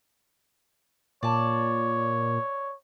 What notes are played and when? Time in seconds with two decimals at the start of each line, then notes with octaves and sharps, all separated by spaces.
1.23 A#2 C#5 D5 A5